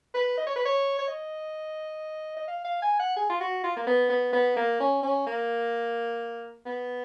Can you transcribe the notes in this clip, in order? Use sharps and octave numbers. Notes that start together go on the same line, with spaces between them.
B4
D#5
C#5
B4
C#5
C#5
D#5
D#5
F5
F5
G#5
F#5
G#4
F4
F#4
F4
A#3
B3
B3
B3
A#3
C#4
C#4
A#3
B3